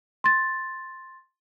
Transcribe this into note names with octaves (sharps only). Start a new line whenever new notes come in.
C6 A6